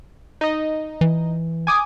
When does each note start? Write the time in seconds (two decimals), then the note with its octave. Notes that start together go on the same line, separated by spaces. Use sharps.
0.41 D#4 D#5
1.01 E3
1.67 G#5 D6 D#6